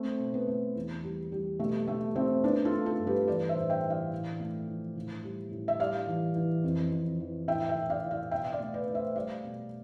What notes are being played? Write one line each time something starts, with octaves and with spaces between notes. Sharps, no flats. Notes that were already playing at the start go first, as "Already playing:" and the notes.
Already playing: A3 C4
B2
B3
A3
E2
G3
G3
B2 A3
A3
A3 C4
A3 B3 D4
F4 A4
A3
F4 A4
G2
G4 B4
E3 B4 D5
C5 E5
A2
E5 G5
E3
D5 F5
A2
A3
F3
A2
G3
A2
E5
G3 D5 F5
E3
E3
F2
F2
E3
A2 E5 G5
E5 G5
A2
D5 F5
A2
D5 F5
B2 E5 G5
D5 F5
A3
B4 D5
A3
C5 E5
G3 D5 F5
B2